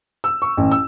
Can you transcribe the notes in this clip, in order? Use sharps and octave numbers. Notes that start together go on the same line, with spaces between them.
E6
C#6
A1
E6